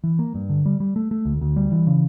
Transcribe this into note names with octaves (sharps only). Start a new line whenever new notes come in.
E3
A#3
G2
D3
G3
G3
A3
A3
D2
D2
G3
E3
C#3